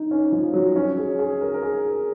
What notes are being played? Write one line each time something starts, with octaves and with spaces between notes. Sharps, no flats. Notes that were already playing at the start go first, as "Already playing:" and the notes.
Already playing: D#4
C#4
F3
F#3
C#4
G#4
G#4
A#4
A#4
G#4